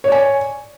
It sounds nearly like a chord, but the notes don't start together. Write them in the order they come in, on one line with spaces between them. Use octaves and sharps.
C#5 D5 G#5